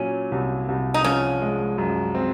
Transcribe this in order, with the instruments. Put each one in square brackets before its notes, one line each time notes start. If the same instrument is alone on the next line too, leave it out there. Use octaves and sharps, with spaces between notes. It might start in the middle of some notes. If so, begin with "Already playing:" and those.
Already playing: [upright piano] A#2 F#3 [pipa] C#4
[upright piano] C2
C2
[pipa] D#4
[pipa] C#3 C#4 [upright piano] F3
[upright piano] G#3
F#2
C4